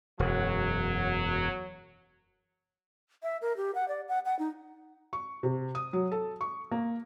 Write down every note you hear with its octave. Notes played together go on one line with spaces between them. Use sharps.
E1 F#2 F#3
E5
A#4
G4
F#5
D5
F#5
F#5
D#4
C#6
C3
D#6
F#3
A4
C#6
A#3